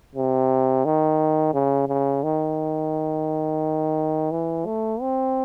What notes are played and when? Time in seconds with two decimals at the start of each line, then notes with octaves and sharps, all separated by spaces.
0.15 C3
0.85 D#3
1.54 C#3
1.88 C#3
2.24 D#3
4.31 E3
4.66 A3
5.01 C4